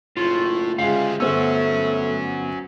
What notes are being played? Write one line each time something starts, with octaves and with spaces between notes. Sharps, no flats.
F#1 A2 F4
D2 C#3 G3 G#3 F4 G#4 F5
G1 F#3 A3 B3 C#4 C5 E6